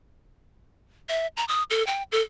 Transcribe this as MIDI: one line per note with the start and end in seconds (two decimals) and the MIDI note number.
1.09 1.27 76
1.37 1.45 82
1.48 1.63 87
1.70 1.85 69
1.87 2.03 79
2.12 2.21 69